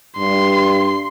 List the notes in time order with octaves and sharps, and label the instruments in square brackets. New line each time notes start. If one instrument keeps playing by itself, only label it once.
[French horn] G2 [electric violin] C6